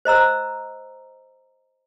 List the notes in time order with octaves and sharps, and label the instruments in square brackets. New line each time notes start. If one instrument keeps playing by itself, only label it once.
[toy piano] C5 D#5 A#5 E6